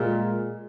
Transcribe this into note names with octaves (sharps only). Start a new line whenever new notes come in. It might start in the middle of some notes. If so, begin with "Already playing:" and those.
Already playing: A#2 G#3